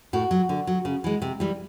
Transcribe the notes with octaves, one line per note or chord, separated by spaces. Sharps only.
A2 F#4
F#3
D3
F#3
C#3
E3 G#3
C3
E3 G3